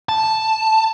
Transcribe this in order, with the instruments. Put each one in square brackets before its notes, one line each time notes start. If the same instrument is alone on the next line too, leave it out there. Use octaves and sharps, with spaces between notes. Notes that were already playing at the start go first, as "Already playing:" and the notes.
[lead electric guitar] A5